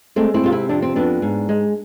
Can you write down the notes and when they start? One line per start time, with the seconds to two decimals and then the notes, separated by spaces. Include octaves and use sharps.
0.16 G#3 A3 C4
0.34 C4 E4
0.44 C3 F4
0.52 C4 E4
0.69 F2 D4
0.82 C4
0.96 F2 B3 D4
1.22 G#2
1.49 G#3